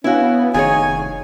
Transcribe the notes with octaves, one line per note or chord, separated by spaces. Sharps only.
B3 C#4 D4 E4 F#4 F5
F1 D#3 G#4 C#5 G#5